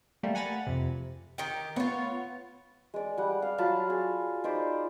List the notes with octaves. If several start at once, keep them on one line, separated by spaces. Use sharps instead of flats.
G3 A3 A#3
F#5 G#5 A#5 B5 A6
F2 C3
D#3 G4
B3 F4 C#5
G#3 D5
G3 F#5
F5
F#3 F4 A5 B5
G#4
D#4 C5 D5 B5